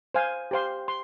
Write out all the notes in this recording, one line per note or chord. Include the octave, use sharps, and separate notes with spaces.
C5 F5 G#5
G4 C5 F5 C6
C6